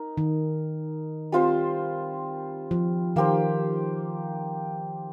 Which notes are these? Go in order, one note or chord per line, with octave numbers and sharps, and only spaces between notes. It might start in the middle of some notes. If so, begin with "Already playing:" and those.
Already playing: D#4 A#4
D#3
G3 C4 F4 C5
F3
D#3 A#3 G4 C5